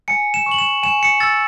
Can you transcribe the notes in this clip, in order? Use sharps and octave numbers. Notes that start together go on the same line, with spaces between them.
G#5 C#7
E7
C#6
F#7
E7
G#5 E7
C#7
E6 A6